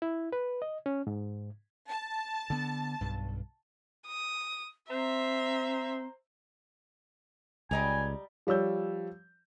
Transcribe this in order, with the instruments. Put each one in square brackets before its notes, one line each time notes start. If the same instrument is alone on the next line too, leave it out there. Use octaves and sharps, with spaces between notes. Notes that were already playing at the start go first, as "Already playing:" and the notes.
[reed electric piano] E4
B4
D#5
C#4
G#2
[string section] A5
[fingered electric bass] D3 B3
B1 G2
[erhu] D#6
[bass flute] C4 [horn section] C5 A#5 [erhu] E5
[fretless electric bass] C#2 [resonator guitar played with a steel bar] G3 D#5 A#5 [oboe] G#5
[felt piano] F3 G3 C#5 E6 G6